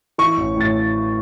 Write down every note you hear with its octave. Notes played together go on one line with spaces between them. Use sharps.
E3 C#6
A1
A2 A6